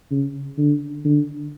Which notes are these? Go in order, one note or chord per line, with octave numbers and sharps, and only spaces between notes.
C#3
D3
D3